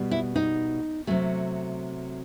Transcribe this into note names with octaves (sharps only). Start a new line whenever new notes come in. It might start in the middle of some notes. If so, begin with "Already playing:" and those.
Already playing: B2 G3
E4
D#4
C3 F#3 A3